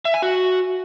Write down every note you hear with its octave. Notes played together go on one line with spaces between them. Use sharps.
E5
G#5
F#4